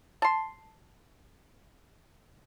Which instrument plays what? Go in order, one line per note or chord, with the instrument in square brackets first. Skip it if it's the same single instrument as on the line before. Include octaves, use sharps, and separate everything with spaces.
[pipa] A5 C6